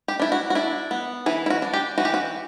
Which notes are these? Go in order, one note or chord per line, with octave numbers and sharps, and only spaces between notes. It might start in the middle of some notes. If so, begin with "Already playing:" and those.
G4
D4 E4
F#4
F#4
D4 E4
B3
E3 E4
E4
F#4
D4
G4
E3 F#4
G4
F#4